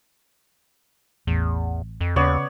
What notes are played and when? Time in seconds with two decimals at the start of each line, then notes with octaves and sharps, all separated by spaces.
1.27 A1 E2
2.01 F2
2.16 D#2 C#3 B3 C#5 D5